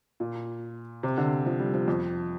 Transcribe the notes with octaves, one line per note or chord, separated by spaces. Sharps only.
A#2
C3
D3
F3
G3
F3
F2